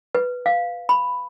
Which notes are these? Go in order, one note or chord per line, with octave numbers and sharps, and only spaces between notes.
B4
F5
B5